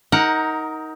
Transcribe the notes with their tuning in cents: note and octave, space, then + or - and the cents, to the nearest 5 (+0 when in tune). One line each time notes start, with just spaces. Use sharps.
D#4 +20 A#4 +0 F#5 +0